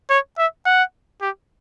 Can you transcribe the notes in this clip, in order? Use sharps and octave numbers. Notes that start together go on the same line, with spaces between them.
C#5
E5
F#5
G4